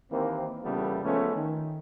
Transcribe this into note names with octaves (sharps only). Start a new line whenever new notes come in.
D#2 E3 A#3 C4
E2 A#2 C#3 G3 A3 B3
F3 G#3 A3 B3 C#4
D#3